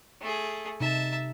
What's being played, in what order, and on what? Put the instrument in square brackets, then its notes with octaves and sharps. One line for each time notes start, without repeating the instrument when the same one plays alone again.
[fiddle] A3 G#4
[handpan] C3 D#4 [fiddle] E5 A5